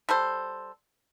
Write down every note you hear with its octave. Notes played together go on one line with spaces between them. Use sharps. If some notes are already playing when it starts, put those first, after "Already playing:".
G3 A4 C5